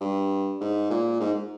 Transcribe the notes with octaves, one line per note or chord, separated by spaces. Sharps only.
G2
G#2
A#2
G#2